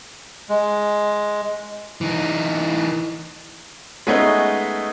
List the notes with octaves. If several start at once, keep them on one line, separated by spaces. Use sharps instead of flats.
G#3
E3 D#4
G#3 A3 B3 C#4 D#4